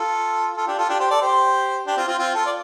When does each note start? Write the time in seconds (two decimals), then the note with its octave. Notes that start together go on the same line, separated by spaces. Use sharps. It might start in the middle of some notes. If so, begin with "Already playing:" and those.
Already playing: F4 A4
0.57 F4 A4
0.68 D4 G4
0.78 F4 A4
0.89 D4 G4
1.00 G4 C5
1.10 A4 D5
1.22 G4 C5
1.86 D4 G4
1.97 C4 F4
2.07 C4 F4
2.19 C4 F4
2.34 F4 A4
2.46 D5